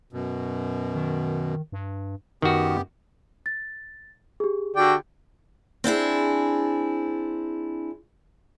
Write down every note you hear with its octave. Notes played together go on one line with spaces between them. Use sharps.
F#2 B2
D#3
G2
F#2 D#3 B3 F#4 G4
A6
G4 G#4
D3 F#4 D5 G5
C4 D4 E4 G#4